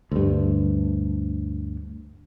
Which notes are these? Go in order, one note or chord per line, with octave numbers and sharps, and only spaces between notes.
D2 G2